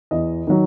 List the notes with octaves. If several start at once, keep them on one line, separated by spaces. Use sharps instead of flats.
E2 D#5
D#3 F#3